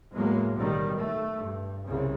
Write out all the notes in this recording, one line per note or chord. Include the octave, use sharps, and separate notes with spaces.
E2 A2 F#3 G#3 A#3
B1 C3 D#3 G3
A3
G2
C2 C#3